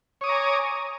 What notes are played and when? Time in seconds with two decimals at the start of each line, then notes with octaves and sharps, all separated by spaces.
0.21 C#5
0.24 D#6
0.26 D6
0.29 A#5
0.32 G#5